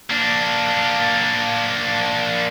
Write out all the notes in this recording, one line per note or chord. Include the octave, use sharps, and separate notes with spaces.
A#3 D4